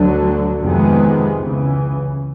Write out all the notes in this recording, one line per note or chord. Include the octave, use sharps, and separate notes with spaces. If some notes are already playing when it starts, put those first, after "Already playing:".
Already playing: D2 D3 F#3
F2 C3 D#3 G#3 B3
C#2 C#3 E3